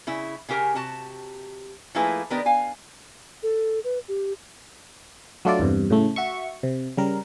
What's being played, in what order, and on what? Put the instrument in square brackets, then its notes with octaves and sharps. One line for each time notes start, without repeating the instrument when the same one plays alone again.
[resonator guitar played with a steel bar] C#3 E4
C#3 C#4 G4 A#4
C3 F#4 A5
F3 A3 A#3 E4 G#4 B4
D#3 B3 D4 G4 A#4
F5 G#5
[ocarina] A4
B4
G4
[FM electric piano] F#3 A3 D4 F4 A4 D5
E2 G2 C3
A2 C#3 A3
F#4 E5 C#6
C3
C#3 G3 A#4